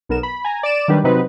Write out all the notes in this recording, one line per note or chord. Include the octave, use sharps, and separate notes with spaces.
B1 B3 A#4 E7
B5
G#5 A#5
D5 D7 E7
D#3 F#3 G3 D4 G4 B4
C3 F#3 C4 D#4 B4